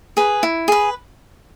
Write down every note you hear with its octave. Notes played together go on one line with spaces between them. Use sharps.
G#4 B4
E4
G#4 B4